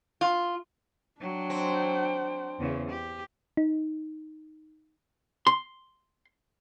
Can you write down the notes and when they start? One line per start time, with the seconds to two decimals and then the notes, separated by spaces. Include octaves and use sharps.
0.21 F4
1.21 F#3 D4 G5
1.50 C4
2.59 E2 C#3
2.90 G4
3.57 D#4
5.47 C6